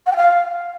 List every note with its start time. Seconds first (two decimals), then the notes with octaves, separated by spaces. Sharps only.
0.06 F#5
0.11 G5
0.17 F5